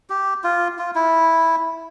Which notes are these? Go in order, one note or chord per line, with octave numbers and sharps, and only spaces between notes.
G4
F4
F4
E4